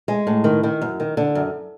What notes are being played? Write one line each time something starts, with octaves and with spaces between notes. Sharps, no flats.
G#3
A2
D#3
D#3
F#2
D#3
D3
F#2